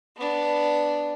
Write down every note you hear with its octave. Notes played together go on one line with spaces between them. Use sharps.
B3 D4